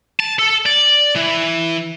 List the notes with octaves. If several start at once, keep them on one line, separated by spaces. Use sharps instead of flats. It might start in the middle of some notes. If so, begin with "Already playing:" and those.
A5
A4
D5
E3